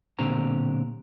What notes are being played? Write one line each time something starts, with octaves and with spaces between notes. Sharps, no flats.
B1 A#2 D3 C4 G4 A#5